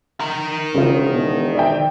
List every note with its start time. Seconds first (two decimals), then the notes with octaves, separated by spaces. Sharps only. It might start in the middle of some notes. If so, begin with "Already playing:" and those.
0.20 D#3 A#4
0.74 E1 C#3 F4
1.13 B2
1.55 D5 E5 G5